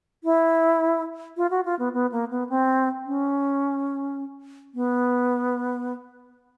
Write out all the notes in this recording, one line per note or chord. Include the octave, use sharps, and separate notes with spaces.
E4
F4
F#4
F4
B3
B3
A#3
B3
C4
C#4
B3